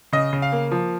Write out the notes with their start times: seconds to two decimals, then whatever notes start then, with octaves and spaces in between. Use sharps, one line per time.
0.13 C#3 D#5
0.33 C#3
0.42 F5
0.52 A#3
0.71 F3